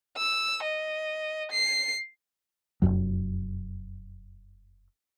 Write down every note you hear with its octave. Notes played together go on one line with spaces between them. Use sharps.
E6
D#5
C7
F1 B1 F#2 F#3